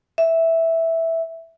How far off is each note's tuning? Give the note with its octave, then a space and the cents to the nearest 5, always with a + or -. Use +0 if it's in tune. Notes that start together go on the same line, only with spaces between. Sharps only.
E5 -5